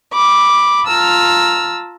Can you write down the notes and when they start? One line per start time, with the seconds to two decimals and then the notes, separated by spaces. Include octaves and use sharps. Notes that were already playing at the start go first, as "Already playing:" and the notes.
0.12 B5 D6
0.88 F4 A5 A#5 E6 F6